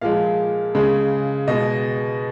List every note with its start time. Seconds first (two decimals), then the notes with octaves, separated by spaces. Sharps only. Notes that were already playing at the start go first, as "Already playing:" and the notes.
0.01 A#2 F3 G#3 F5
0.75 C#3 G#3
1.48 B2 G#3 D#5